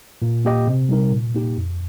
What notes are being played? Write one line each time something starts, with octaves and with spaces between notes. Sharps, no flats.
A#2
A#3 G4 D#5
C3
G3 D#4 A#4
A#2
A#3 D#4 G4
F2